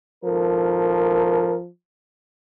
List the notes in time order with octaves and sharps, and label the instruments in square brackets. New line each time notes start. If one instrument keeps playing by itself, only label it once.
[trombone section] G#1 A4 A#4 [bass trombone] F3